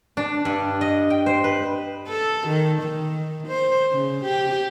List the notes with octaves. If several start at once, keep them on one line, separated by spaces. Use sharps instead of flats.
D4
G2
D#5
G5
C5
B4
A4
D#3
D#3
C5
C#3
G4